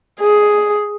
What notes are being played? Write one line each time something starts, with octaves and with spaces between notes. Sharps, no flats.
G#4